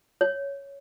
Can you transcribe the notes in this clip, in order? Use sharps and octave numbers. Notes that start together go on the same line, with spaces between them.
C#5